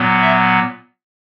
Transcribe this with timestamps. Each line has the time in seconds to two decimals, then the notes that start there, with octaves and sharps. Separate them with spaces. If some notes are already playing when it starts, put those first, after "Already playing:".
Already playing: A#2 F#3 B3
0.21 E5